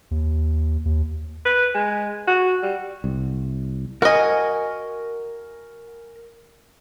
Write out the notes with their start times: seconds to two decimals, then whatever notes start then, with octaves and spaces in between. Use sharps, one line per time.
0.11 D#2
0.85 D#2
1.45 B4
1.74 G#3
2.27 F#4
2.62 G3
3.04 C2
4.02 F#4 A#4 D#5 G#5